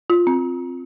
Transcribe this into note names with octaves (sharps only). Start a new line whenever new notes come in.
F4
C4